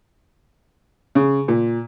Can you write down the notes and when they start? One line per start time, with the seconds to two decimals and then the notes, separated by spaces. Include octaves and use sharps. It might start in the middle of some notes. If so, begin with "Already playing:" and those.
1.15 C#3
1.48 A#2